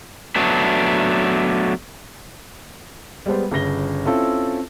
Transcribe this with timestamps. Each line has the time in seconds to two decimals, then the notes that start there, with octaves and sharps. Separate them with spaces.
0.36 F#3 A3 B3 D4
3.26 G3 G#3 B3 C5
3.51 G1 C#3 A#6 G7
4.05 C4 C#4 E4 F4 A4